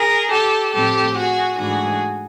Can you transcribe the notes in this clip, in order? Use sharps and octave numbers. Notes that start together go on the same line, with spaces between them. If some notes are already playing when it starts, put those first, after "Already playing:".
Already playing: G#4 A#4
G4 A4
A2 F3 A3 C4 G4 A4
F#4 G#4
G#2 E3 A3 D4 F#4 G#4